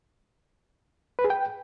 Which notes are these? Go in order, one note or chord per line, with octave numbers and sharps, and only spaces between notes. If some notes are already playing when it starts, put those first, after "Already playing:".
B4
G#4
G5